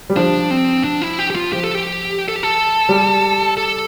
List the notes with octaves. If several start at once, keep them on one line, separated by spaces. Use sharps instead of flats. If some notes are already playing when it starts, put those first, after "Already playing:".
G3
F3 D4
C4
D4
E4
G4
G4
F4
F3 G4
A4
G4
A4
G4
A4
G3
A4